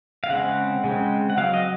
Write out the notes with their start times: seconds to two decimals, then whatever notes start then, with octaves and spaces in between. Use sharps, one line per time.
0.24 F5
0.30 C#3 G#3 C4 F#5
0.84 C#3 G#3 C4
1.30 F#5
1.37 F#3 C4 F5
1.54 D#5